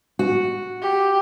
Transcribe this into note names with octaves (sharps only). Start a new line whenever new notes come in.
F#4
G4